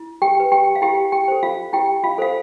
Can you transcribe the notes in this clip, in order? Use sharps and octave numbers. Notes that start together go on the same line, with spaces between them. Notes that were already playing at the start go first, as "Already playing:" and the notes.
Already playing: E4
G4 G5
G4 B4
G4 G5
F5
E4 G4 G5
G4 G5
A4 C5
F4 F5
E4 G4 G5
F4 F5
A4 C5 F5